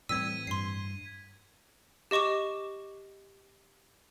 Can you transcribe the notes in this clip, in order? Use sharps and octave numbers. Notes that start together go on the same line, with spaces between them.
A2 E3 G3 C4 E6 G#6 B6 D#7
G2 C6 C7
G4 D#5 C#6 D6 E7